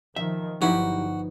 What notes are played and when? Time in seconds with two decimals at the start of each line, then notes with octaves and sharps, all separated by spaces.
0.16 D#3 F3 E5
0.62 G1 F3 F#3 D#4 E4 F#4 G4 B4